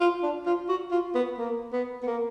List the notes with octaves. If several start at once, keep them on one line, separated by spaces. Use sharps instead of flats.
F4
D4
F4
F#4
F4
B3
A#3
B3
B3
A#3